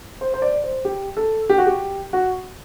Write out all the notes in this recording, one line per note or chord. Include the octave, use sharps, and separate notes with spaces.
C5
C5
D5
C5
G4
A4
G4
F#4
G4
F#4